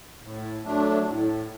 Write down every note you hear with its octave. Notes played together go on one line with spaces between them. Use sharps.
A2
F#3 A3 D4
A2